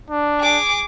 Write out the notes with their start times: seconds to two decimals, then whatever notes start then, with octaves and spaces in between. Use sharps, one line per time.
0.10 D4
0.39 G#4 D6